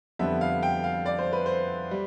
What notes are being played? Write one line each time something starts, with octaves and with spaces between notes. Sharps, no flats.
F2 D3 G3 B3 E5
F5
G5
F5
D5
C5
B4
C5
G3